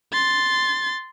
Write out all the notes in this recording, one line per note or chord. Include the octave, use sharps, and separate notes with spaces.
C6 A6